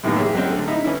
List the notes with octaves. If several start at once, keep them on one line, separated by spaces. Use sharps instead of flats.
F#2 A2 C3 D#3 E3 A#3
G4 G#4 C#5 E5
F#3 G#3 C4 C#4
D3 A3
D#4 E4 E5
E3 C#4 E4